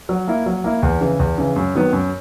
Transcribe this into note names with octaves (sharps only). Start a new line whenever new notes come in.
F#3
A#3 E4
F#3
A#3 E4
E2
C#3 E3
E2
C#3 E3
F#2
D#3 F#3 B3
F#2